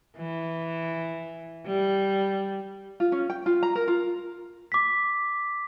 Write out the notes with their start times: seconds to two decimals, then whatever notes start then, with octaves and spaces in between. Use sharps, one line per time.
0.17 E3
1.66 G3
3.00 F4
3.12 C#4
3.30 G5
3.46 F4
3.63 A#5
3.75 A#4
3.88 F4
4.72 D6 B6